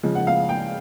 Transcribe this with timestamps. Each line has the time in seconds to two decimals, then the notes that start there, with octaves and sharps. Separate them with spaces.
0.03 C#3 F3 G#3
0.15 F#5
0.27 F5
0.49 G5